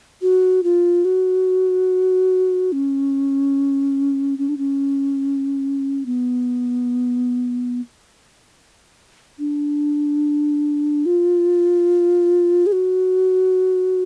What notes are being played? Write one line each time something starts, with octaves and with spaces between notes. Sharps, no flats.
F#4
F4
F#4
C#4
C#4
D4
C#4
B3
D4
F4
G#4
F#4